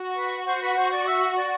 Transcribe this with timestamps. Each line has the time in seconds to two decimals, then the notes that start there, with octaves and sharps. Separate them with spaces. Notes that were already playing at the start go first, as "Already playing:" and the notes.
Already playing: F#4
0.17 B4
0.47 C5
0.62 B4
0.77 C5
0.92 D5
1.07 E5
1.38 D5